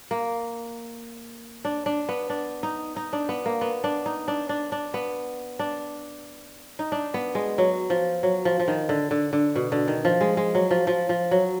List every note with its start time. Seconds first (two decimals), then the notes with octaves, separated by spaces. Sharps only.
0.11 A#3
1.65 D4
1.86 D4
2.09 B3
2.30 D4
2.63 D#4
2.96 D#4
3.13 D4
3.29 B3
3.46 A#3
3.61 B3
3.84 D4
4.06 D#4
4.28 D4
4.49 D4
4.72 D4
4.94 B3
5.59 D4
6.79 D#4
6.92 D4
7.14 B3
7.35 G#3
7.58 F#3
7.90 F3
8.23 F#3
8.45 F3
8.59 F3
8.68 D#3
8.89 D3
9.11 D3
9.33 D3
9.56 B2
9.72 D3
9.88 D#3
10.05 F3
10.21 G#3
10.37 G#3
10.55 F#3
10.71 F3
10.87 F3
11.09 F3
11.31 F#3